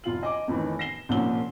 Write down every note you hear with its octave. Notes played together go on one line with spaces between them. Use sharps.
F1 F4 F#7
D#5 G#5 D6
F2 A2 D#3 E3
A#6 C7 E7 G7
C2 A#2 F3 C#4 G7